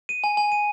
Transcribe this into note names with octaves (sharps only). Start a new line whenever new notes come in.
D#7
G#5
G#5
D#7